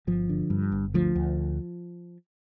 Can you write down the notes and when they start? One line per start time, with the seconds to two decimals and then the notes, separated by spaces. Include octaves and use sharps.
0.07 G1 F3
0.29 D3
0.50 G2
0.72 G1
0.94 D2 F3
1.15 D2